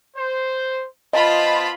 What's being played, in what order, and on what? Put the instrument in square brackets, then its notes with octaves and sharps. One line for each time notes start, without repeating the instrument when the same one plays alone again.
[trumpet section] C5
[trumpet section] B3 C5 A5 [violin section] F4 B5 [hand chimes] D#5